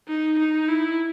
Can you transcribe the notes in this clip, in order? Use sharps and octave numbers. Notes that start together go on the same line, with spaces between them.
D#4
D#4
E4